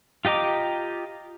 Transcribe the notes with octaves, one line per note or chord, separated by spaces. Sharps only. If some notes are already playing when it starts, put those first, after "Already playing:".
F4 G4 D#5 A#5 D6